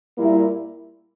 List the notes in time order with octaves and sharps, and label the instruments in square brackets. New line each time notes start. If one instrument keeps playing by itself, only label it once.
[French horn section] A#2 G3 A#3 E4